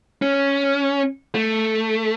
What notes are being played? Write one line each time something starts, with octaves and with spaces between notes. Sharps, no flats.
C#4
A3